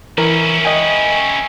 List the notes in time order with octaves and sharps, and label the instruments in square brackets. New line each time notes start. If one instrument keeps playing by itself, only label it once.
[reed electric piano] E3 A#4 [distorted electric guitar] C#4 E4
[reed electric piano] D#5 G5 G#5